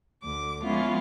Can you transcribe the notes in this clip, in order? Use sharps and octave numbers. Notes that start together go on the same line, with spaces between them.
D2 D6
F3 G#3 B3 C#4 E4 F4